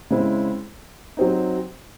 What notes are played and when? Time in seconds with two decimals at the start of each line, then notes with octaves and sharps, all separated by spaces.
0.11 C#3 G#3 C4 E4
1.17 F#3 C4 D#4